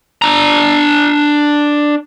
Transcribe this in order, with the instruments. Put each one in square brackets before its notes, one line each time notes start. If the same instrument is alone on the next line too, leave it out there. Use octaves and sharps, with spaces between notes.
[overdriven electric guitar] D4 A#5